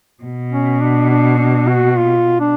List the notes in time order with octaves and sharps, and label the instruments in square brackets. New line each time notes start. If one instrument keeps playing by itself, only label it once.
[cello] B2
[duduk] C#4
D4
D4
D4
F#4
F4
D4